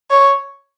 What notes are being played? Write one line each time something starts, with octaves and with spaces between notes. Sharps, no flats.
C#5